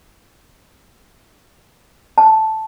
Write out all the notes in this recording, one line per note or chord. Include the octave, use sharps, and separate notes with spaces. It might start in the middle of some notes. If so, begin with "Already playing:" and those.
A5